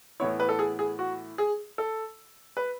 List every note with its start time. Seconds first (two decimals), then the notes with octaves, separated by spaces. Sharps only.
0.20 A2 E3 B3 E4 C#5
0.40 B4
0.49 A4
0.59 G#4
0.79 G#4
0.99 F#4
1.38 G#4
1.78 A4
2.57 B4